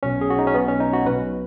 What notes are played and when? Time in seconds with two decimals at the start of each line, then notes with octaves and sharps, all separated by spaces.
0.03 B1 B2 C#4
0.21 G#4
0.30 F#4
0.39 D#4
0.47 C#4
0.54 B1 B2 B3
0.68 C#4
0.80 D#4
0.93 F#4
1.06 B1 B4
1.10 B2